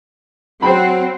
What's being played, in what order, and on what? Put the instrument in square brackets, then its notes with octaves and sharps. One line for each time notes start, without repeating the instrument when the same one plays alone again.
[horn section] F#3 F#5 [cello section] C4 [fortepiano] C5 G5 B5